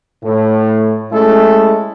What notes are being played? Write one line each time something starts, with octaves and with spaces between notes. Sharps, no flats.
A2
G#3 A3 C#4 E4 A4